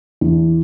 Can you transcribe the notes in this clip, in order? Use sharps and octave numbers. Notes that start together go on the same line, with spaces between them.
E2